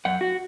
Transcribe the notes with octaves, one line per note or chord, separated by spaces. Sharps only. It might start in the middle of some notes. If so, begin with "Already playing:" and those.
F#2 F#5
F#4